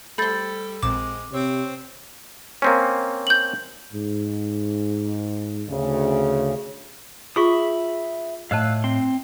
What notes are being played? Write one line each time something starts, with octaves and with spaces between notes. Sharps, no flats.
G3 A3 A4 C5 B5 G6 A6
A#1 A#2 G#3 C4 D6 E7
C3 C4 C#5
A#3 C4 C#4
G6 F#7
G#2
D2 C#3
F4 G#4 E5 B5 C#6 D#6
A2 D#5 F5 A5 E6 F#6
C4 C6